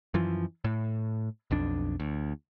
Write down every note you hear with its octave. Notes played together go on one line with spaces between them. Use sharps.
F#2 E3 F3
A2
B1 F2 D4
D2